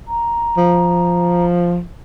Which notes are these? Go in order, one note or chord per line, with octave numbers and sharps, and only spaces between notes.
A#5
F3